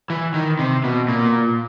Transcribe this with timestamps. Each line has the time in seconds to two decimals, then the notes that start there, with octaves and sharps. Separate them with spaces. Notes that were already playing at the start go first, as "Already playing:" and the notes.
0.10 E3
0.34 D#3
0.59 C3
0.84 B2
1.08 A#2